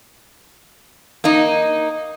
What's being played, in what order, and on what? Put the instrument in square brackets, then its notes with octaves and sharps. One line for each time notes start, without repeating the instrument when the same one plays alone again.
[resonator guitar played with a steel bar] A#3 D#4